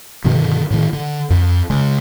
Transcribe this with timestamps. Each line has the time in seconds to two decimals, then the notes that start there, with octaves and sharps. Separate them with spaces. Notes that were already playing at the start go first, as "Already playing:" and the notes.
0.24 G2 B2 D3 D#3
0.71 A2 D#3
0.93 D3
1.30 F2
1.70 C#3 G#3